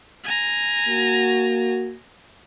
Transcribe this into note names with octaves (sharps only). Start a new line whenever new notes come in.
G#5 A#5
A#3 F#4